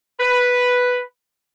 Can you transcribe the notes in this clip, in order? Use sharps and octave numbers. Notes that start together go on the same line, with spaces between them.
B4